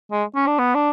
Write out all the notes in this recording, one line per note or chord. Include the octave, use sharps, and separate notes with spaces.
G#3
C#4
D4
B3
D4